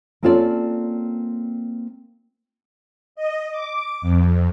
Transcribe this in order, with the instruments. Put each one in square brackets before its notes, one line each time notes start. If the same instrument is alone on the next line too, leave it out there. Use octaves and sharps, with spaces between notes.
[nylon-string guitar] A#3 C4 C#4 F4 A4 D5
[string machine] D#5
D6
F2